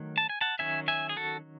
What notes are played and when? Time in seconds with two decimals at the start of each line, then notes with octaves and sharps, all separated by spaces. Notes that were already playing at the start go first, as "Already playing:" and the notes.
Already playing: D#3 F#3 A3
0.18 A5
0.29 G#5
0.41 F#5 A5
0.59 D#3 F#3 C#4 E5 G#5
0.88 E5 G#5
1.09 G#4
1.16 F#4 A4